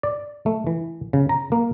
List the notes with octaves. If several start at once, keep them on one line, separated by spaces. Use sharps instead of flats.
D5
A3
E3
C#3
A#5
A#3